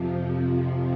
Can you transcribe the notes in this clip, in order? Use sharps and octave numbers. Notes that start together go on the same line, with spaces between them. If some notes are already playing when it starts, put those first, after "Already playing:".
Already playing: F2 C3 F3